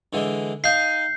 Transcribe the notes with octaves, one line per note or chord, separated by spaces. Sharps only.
D3 E3 G#3
D#4 F5 G#5 G6 C7